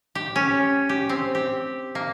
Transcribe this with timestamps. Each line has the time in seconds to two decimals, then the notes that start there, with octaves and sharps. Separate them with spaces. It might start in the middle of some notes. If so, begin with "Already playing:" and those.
0.15 G4
0.36 C#4
0.89 G4
1.09 C4
1.35 G4
1.95 A#3